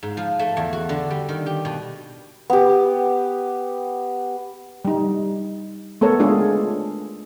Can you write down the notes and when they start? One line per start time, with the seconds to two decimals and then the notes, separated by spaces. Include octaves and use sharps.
0.03 G#2
0.17 F3
0.39 A3
0.57 E2
0.73 F#4
0.89 D3
1.10 G3
1.29 D#3
1.46 G4
1.65 B2
2.50 B3 G4
4.85 G3 D#4
6.01 A3 B3 A4 A#4 C#5
6.20 G#3 D4 F4 G#4